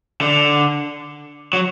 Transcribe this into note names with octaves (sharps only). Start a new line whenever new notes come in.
D3
F#3